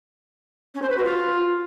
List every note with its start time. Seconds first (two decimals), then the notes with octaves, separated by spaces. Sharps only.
0.75 C#4
0.82 C5
0.90 B4
0.97 F#4
1.04 F4